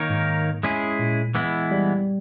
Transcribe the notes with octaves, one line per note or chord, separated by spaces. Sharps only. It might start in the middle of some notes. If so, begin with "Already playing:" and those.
Already playing: D#3 A#3 D#4 A#4 C#5
G#2
G#3 C#4 E4 G#4
A#2
E3 G#3 B3 E4
G3